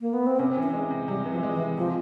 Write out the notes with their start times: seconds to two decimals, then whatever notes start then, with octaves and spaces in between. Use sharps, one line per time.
0.01 A#3
0.13 B3
0.27 C4
0.39 C3 C#4
0.57 E3
0.62 C#4
0.73 G#3
0.91 C3
1.08 C3 G3
1.25 E3
1.31 F3
1.43 G#3
1.54 E3
1.60 C3
1.77 C3 F3